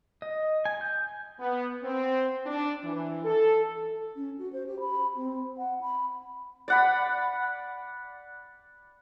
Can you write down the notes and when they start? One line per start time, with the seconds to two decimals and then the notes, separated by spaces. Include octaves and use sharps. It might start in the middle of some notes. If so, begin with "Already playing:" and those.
0.22 D#5
0.65 G#5
0.81 G6
1.40 B3
1.83 C4
2.46 D4
2.84 E3
3.24 A4
4.16 C#4
4.39 F#4
4.53 C5
4.67 G4
4.80 B5
5.17 C4
5.58 F#5
5.81 B5
6.68 D5 F#5 B5